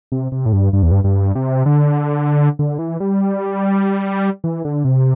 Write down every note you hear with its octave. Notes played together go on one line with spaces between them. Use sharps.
C3
C3
A2
G2
G2
E2
G2
G2
C3
D3
D3
E3
G3
E3
D3
C3